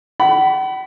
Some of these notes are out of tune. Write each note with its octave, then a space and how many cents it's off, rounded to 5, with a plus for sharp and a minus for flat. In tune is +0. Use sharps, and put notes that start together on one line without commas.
F#5 +45 B5 +0